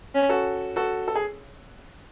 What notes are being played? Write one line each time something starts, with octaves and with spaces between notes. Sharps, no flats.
C#4
F#4 A4
F#4 A4
A4
G#4